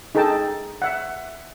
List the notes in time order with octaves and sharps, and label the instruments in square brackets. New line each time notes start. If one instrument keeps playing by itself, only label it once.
[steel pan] D#4 G#4 A4 G5 A5
E5 F#5